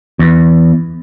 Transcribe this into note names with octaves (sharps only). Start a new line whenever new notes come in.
E2